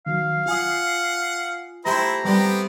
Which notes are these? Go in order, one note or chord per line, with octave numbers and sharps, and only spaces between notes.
D#3 F#3 F5
F4 F#5 G#5 D#6
A3 E4 G4 C5 E5 A#5
G3 B3 C4 G4